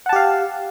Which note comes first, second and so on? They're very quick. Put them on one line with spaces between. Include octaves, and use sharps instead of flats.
F#5 A5 G4 F5